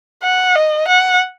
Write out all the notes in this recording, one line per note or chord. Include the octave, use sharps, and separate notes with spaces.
F#5
D#5
F#5